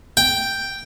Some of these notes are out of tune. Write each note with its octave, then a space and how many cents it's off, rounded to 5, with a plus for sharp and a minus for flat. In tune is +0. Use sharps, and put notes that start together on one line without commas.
G5 +0